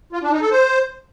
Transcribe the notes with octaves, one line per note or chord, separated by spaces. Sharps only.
F4
D4
D#4
A4
C5